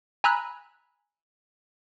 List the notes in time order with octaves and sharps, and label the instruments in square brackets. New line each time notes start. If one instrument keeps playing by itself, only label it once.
[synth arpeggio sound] G#5 A#5 B5 E6 F#6